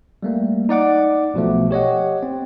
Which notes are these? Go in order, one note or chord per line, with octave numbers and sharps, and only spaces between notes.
G3 A3 A#3
D#4 D5 F#5 D6
B1 B2 F3 A3
G4 C#5 D#5 F#5
C4